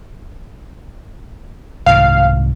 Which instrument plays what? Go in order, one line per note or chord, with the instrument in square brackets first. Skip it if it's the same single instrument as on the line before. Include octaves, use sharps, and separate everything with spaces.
[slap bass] C2 G#2 D#3 [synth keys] F5